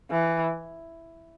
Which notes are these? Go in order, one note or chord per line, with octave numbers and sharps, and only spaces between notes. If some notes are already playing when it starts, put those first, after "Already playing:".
E3